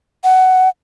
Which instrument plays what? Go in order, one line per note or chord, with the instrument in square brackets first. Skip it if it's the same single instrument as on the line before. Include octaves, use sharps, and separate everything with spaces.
[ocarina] F#5